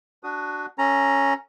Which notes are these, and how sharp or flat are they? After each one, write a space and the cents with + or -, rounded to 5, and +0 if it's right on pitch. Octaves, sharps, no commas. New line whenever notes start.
D4 +0 F#4 +10 D#6 +0
C#4 +0 A4 +10 A#5 +0